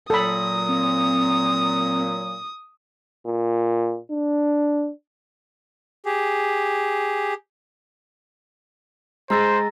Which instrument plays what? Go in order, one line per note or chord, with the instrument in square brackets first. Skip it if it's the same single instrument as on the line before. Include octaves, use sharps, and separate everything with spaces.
[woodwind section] A#2 F#3 [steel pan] A4 B5 [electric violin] D#6
[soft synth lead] C4
[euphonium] A#2
D4
[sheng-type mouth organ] G4 G#4
[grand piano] G#3 E6 [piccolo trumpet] C5 [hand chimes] A#5 A6 A#6